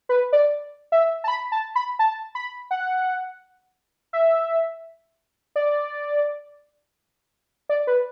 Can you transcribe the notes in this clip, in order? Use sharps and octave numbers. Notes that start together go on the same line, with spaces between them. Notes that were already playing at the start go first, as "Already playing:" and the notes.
B4
D5
E5
A5
B5
A5
B5
A5
B5
F#5
E5
D5
D5
B4